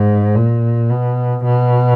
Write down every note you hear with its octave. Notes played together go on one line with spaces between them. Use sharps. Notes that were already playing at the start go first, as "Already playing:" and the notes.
Already playing: G#2
A#2
B2
B2